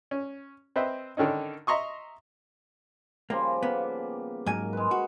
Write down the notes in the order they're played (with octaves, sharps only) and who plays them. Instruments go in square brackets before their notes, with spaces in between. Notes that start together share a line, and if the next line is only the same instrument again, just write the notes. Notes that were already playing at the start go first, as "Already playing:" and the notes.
[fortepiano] C#4
C4 B4 C5 D#5 E5
D3 D#3 C#4 D#4
D#5 E5 A#5 C6 C#6 D#6
[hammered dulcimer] C#3 F3 G3 [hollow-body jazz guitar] A#3
[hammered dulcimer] A#3 [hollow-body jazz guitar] B3
[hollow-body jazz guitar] G#2 F#3 G#5 [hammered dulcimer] A#4
[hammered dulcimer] G#3 B4
[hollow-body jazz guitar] F#4